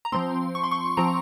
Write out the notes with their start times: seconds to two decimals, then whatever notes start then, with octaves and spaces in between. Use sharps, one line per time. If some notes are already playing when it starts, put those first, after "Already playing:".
0.05 A#5
0.12 F3 C4 C6
0.55 C#6
0.63 C6
0.71 C#6
0.97 F3 C4 A#5